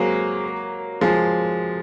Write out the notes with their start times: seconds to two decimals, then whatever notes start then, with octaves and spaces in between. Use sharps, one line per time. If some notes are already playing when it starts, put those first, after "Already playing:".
Already playing: F#3 G#3 A#3 C4
1.01 F3 G#3